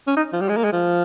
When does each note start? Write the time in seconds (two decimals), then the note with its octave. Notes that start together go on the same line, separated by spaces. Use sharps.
0.07 C#4
0.16 D#4
0.33 F3
0.41 G3
0.49 G#3
0.57 A#3
0.64 G#3
0.72 F3